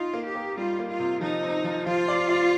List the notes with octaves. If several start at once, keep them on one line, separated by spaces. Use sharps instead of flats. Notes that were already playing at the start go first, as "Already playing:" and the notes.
Already playing: D#4 F4
A#3
G4
A#3
G3 F4
A#3
F4
C3
F3 D#4
C4
F3
F3 F4
D5
D5